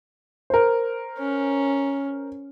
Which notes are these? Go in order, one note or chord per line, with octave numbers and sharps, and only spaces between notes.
A#4 C5
C#4